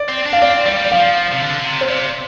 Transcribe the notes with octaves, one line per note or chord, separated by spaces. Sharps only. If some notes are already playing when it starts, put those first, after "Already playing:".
Already playing: D5
C4
D4
F5
C4 D5
G3 D5
G3
D5
F3 F5
C3
D3
D3
C3
C5
C3 D5